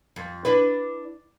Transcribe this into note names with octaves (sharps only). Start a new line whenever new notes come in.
F2
D4 E4 B4